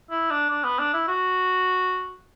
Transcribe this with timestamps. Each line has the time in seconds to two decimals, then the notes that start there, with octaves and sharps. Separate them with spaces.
0.10 E4
0.30 D4
0.50 D4
0.64 B3
0.79 D4
0.94 E4
1.08 F#4